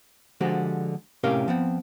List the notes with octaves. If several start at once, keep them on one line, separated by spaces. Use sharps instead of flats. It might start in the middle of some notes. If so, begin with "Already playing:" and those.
D3 F3 G#3 F#4 G4 C5
A2 C3 C#4 G4 A#4 F5
F3 B3 C4